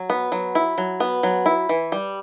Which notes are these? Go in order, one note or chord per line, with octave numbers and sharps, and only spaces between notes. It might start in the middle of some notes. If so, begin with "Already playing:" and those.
Already playing: F#3
B3
F#3
E4
F#3
B3
F#3
E4
E3
G3